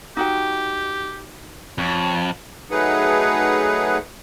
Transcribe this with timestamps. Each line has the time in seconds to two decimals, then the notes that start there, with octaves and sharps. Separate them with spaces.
0.17 D#4 F#4 G4 G5
1.78 F2 C#5
2.71 F#3 A3 D#4 G#4 B4 F#5